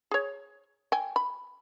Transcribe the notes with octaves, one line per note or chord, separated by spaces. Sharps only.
G#4 C#5
G5 G#5
B5